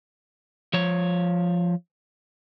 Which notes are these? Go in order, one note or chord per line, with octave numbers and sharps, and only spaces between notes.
F3 C#5